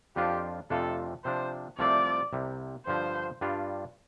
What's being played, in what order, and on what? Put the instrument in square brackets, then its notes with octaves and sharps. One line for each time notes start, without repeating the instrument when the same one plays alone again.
[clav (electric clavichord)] F2 F3 D4 F4 [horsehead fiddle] G4
[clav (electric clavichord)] F2 C3 A3 D4 F4 [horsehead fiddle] A4
[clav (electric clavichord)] C3 F3 D4 [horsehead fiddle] C5
[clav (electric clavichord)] C2 C3 F3 A3 C4 [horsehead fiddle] D5
[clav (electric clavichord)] C2 C3 G3
[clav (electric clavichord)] G2 D3 F3 [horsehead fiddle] C5
[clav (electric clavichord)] G2 G3 D4 F4